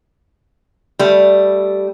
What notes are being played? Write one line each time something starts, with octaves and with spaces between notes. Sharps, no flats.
G3 A3